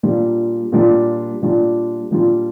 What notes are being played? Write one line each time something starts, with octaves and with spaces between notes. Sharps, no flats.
A#2 G3 D4 F4
A#2 G3 D4 F4
A#2 G3 D4 F4
A#2 G3 D4 F4